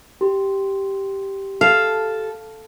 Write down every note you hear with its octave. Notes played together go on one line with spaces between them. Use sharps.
G4 C6
A4 F5